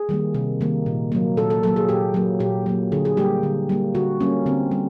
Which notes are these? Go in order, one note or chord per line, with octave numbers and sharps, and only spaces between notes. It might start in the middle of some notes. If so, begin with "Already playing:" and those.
Already playing: G#4
D#3 G3 A#3
C3
D#3 G3 A#3
A#2
F#3 A#3
A#2 A4
A4
F#3 A#3 A4
G#4
A#2 G4
F#3 A#3
A#2 G4
F#3 A#3
D3 G#4
G#4
G3 A#3 G4
D3
G3 A#3
D3 F#4
G3 A#3 C#4
D3 C4
G3